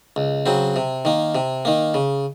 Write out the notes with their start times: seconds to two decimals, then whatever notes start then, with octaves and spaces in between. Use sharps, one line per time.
0.16 C#2
0.46 C#3 F#3 C4
0.76 C3
1.05 D#3 A#3
1.35 C3
1.65 D#3 A#3
1.94 C#3